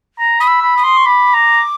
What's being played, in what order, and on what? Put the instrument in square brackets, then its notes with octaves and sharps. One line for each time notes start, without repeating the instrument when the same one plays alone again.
[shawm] A#5
[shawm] B5 [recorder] D#6
[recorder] E6
[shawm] B5
[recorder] D#6
[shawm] C6
[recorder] C#6
[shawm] B5 [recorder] D6
[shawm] A#5